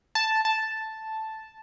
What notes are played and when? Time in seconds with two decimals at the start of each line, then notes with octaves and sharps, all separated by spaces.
0.15 A5
0.45 A5